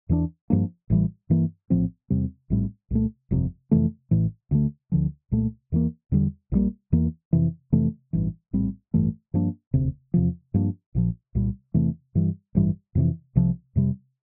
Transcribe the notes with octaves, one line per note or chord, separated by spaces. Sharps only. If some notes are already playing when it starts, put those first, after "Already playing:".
E2 E3 A#3 D4
G2 F3 A#3 D4
A1 A2 E3 G3
G2 E3 A#3
A#1 A2 F3 C4
E2 C3 G3 C4
A#1 A2 G3 C4
C2 A#2 A3
G1 F2 C3
F2 C3 E3 A3
A1 A2 E3
D2 D3 A3
D2 D3 F3
C2 A#2 A3
E2 E3 A#3
E2 D3 G3
A#1 A#2 G3 A#3
E2 E3 A#3
F2 C3 E3
F2 C3 E3 A3
A1 G2 E3
A#1 A2 G3 C4
A1 G2 E3 A3
G2 F3 A#3 D4
E1 D2 C3
E2 C3 F3
G2 F3 A#3 D4
A#1 A#2 F3
C2 A#2 G3
E2 C3 E3 A3
G2 E3 G3
A1 G2 E3 G3
F2 C3 E3
C2 C3 F3
F2 C3 G3